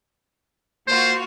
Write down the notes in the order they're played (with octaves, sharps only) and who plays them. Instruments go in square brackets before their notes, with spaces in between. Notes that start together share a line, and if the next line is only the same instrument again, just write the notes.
[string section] A#3 F4 F#4 [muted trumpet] C5